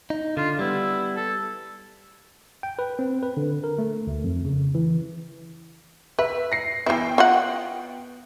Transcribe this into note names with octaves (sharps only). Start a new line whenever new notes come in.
D#4
D3 F4
G3 B3 E4
A4
G5
B4
C4
B4
D3
A#4
A3
D2
F2
C#3
E3
B4 E5
A#6 C7
E3 B3 E4 G5
F4 D#5 F#5